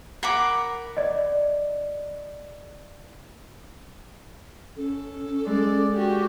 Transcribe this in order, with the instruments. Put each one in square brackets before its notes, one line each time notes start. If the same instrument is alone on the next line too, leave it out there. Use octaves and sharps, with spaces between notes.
[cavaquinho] A#4 F#5 B5 D6
[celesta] D5 D#5
[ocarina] C#4 [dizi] A4
[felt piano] G#3 [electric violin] D5
[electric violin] F#4 G4